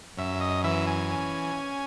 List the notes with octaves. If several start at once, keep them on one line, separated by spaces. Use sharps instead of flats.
F#2 E5
D#5
E3 E5
G#5
C#4